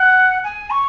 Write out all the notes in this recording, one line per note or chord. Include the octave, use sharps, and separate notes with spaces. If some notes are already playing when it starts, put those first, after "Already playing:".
Already playing: F#5
G#5
C#6